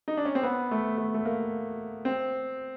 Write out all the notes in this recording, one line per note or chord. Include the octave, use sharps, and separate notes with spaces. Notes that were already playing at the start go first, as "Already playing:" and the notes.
D#4
D4
C#4
C4
B3
A3
A3
A3
A#3
C4